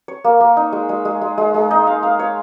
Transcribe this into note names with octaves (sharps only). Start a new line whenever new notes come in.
C#5
A#3
A#3
D#4
G#3
G#3
G#3
G#3
G#3
G#3
D#4
F5
F5
C#5